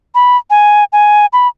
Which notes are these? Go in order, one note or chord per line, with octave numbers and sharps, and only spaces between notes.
B5
G#5
G#5
B5